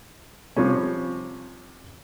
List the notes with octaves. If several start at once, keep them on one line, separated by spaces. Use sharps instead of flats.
C3 F3 G3 C#4